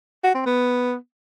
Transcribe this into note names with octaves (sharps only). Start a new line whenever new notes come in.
F#4
C4
B3